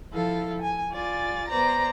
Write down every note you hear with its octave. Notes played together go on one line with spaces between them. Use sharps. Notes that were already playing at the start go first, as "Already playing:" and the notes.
F3 E4 A4 F5
G#5
F4 D5 G#5 A6
B3 C5 D5 A#5